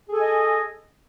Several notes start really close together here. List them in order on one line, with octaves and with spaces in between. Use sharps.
G#4 A4 G#5 D#5